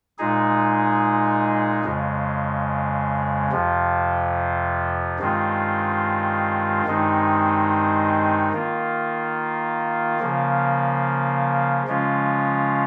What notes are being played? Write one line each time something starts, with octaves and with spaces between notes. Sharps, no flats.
A#2 G#3 D#4 G#4
F2 C#3 G#3
F2 C3 F3
G2 D#3 G#3 C4 F4
G2 D#3 G#3 C4 D#4
D#3 A#3 F4
C#3 F3 A#3
C#3 F3 G#3 C#4 F4